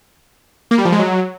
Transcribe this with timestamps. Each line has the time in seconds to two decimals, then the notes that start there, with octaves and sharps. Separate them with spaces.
0.71 A#3
0.78 G3
0.85 F3
0.92 G#3
0.99 F#3